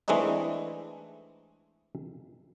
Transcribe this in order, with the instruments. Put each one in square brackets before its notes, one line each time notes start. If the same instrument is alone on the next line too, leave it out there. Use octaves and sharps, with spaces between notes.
[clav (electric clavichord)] E3 G#3 A3 C4 D4 D#4